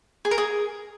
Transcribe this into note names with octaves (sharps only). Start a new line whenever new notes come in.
G#4
A#4
G#4